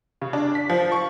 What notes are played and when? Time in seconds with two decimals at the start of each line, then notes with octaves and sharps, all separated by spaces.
0.22 C#3
0.33 D4
0.55 B6
0.70 F3
0.92 C#6